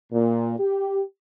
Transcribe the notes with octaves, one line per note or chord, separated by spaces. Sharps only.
A#2
G4